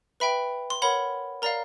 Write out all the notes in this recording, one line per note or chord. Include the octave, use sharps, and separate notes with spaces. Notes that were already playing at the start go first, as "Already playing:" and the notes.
B4 E5 G5 B5
C6
A#4 C#5 F#5 B5
A#4 D5 F5 A#5